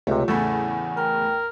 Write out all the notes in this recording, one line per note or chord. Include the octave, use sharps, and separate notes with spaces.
C#2 C3 A3 F4 G4 C#5
E2 A2 C#3 A3 E4 A4 F#5 G#5
A#4 G5